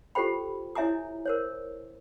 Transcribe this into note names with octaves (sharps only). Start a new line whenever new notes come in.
F4 G4 A4 C5 G5 B5
E4 C#5 E5 G#5 A#5 D#6
A#4 C5 C#5